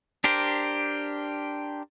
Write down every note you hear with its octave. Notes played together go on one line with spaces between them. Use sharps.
D4 G4 A#4 C5